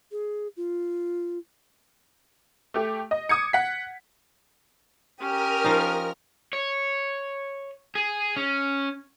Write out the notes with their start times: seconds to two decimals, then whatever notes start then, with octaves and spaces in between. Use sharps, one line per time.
0.12 G#4
0.57 F4
2.74 A3 G4
3.11 D#5
3.29 D6 D#6 G#6 C#7
3.53 F#5 B6
5.20 C#4 G4 A#4 D#6 F6
5.64 F3 D#4
6.53 C#5
7.95 G#4
8.36 C#4